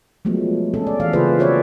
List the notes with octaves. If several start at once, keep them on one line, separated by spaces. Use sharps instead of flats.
F3 F#3 G#3 A3 B3
C#4 G#4 A4
D5
E3 E5 F5
C#3 A#3 F4 G#4 B4 C5
F#4 A4 B4 C#5 D5 E5